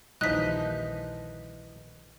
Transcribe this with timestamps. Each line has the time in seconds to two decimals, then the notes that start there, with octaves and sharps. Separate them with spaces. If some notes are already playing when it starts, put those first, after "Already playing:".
0.21 A#1 D#2 E3 F3 G3 D#4 F#6 B6